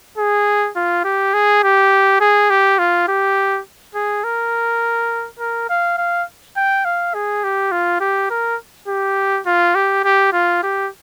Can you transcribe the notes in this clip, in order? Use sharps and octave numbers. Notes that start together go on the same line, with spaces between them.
G#4
F4
G4
G#4
G4
G#4
G4
F4
G4
G#4
A#4
A#4
F5
F5
G5
F5
G#4
G4
F4
G4
A#4
G4
F4
G4
G4
F4
G4